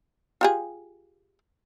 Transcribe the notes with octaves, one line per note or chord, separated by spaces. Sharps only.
F4 G4 G#4